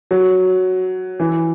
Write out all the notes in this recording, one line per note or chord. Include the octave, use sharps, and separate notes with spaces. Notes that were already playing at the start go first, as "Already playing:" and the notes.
F#3
E3